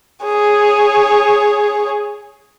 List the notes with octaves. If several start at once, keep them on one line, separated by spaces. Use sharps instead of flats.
G#4 C#5